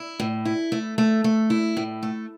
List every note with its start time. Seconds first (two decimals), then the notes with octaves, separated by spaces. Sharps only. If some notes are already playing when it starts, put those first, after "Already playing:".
Already playing: E4
0.20 A2
0.45 E4
0.72 A3
0.98 A3
1.24 A3
1.50 E4
1.77 A2
2.03 A3